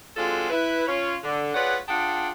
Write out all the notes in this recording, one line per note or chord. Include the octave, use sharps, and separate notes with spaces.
G#3 C4 D4 F4 F#4 A4
E4 B4
C#4 F4 C#5
D3
F4 G#4 B4 C#5 D5 F#5
D4 F4 G#4 F#5 G5 A5